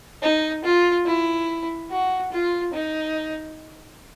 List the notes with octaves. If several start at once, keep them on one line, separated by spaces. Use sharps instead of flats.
D#4
F4
E4
F#4
F4
D#4